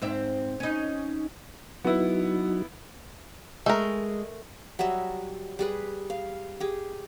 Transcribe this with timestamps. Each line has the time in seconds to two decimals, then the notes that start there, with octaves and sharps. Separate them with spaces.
0.02 G#2 C4 E5
0.60 C#4 D#4
1.85 F#3 B3 D#4 E4 F#4
3.66 G#3 A3 A#4
4.79 F#3 G3 D#5 E5
5.59 G3 G#4 B4
6.10 F5
6.60 G4 G#4